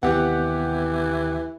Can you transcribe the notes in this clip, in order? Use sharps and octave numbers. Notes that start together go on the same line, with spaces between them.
D#2 C3 E3 B3 G4 F#5